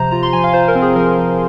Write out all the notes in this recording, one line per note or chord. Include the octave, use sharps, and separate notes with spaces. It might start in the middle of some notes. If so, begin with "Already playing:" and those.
Already playing: C3 F3 C5 A#5
F4 A#5
C6
F3 G#5
F5
F4 C5
A#4
C4
G#4
F3 A#4
F3